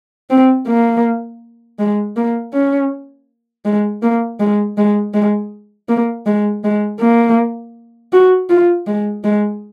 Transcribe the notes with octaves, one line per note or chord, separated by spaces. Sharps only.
C4
A#3
G#3
A#3
C#4
G#3
A#3
G#3
G#3
G#3
A#3
G#3
G#3
A#3
F#4
F4
G#3
G#3